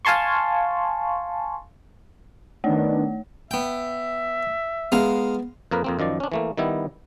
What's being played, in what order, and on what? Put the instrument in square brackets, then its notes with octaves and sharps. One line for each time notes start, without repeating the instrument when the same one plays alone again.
[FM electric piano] F5 G#5 A5 C6 C#6
[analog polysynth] D#3 B3 D4 [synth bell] A3 C#5
[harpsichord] B3 G5 [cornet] E5
[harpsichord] G#3 F5 A#5 [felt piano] B3
[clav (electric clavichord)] F2 A#3 A#4 B4
F2 A#3 C4
F#2 D#3 F3 D5
C#4 D4
E3 A3 A#3
D#3 G3 B3 E4